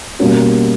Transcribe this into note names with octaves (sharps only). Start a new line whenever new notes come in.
B2 G3 A#3 C#4 F#4